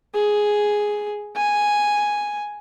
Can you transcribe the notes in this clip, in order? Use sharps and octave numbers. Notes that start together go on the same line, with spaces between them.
G#4
G#5